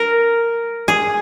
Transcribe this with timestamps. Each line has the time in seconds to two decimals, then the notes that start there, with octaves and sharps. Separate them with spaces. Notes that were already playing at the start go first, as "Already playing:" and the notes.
Already playing: A#4
0.88 G#4